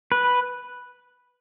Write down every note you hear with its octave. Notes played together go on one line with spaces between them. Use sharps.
B4